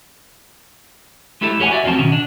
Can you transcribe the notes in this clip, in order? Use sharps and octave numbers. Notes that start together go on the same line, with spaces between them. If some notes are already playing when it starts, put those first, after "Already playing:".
G#3 A3 E4 G4 A4
E2 A3 G4 C#5 F#5 G#5
F#4 D5 E5
E2 F3 F#3 A3 C4 A5
B2 D#3 C#4
D4